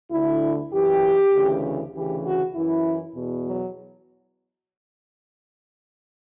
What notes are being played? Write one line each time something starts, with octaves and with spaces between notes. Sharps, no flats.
D2 D3 E4
F#2 E3 G4
D2 C#3 E3
D2 C#3 E3 G4
F#4
F#2 E3 E4
E2 B2
F#3